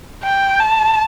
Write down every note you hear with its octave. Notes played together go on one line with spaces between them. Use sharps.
G5
A5